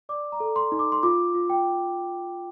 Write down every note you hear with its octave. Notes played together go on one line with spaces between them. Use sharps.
D5 D6
A#5
A4
C6
D#4
D6
C6
F4 D6
F4
G5